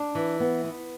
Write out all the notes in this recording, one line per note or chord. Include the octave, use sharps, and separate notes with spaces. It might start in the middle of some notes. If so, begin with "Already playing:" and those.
Already playing: D4
E3
B3
B3